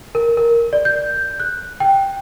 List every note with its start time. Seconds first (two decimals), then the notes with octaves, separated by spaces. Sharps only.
0.15 A#4
0.37 A#4
0.73 D5
0.85 G6
1.40 F#6
1.80 G5